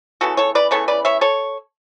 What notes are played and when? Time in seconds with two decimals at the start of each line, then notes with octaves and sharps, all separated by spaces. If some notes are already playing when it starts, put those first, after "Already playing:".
0.21 C#3 E3 B3 F#4 A4
0.37 A4 C#5
0.55 B4 D5
0.71 C#3 E3 B3 A4 C#5
0.88 B4 D5
1.05 C#5 E5
1.21 A4 C#5